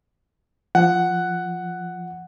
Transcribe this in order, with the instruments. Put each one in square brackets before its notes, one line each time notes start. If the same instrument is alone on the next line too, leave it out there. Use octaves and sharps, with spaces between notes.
[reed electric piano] F3 [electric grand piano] F#5